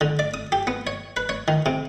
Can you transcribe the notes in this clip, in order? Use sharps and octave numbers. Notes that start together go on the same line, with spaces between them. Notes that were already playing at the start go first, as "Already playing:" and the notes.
D3
D5
D#6
G4
B3
C#5
B4
C#5
D#3
C3